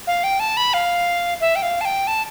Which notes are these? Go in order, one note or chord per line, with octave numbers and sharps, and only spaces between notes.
F5
G5
A5
B5
F5
E5
G5
F5
A5
G5
A5